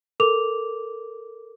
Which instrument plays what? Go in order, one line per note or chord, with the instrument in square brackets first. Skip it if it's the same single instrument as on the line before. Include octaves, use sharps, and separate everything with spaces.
[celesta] A4 A#4 D6 F7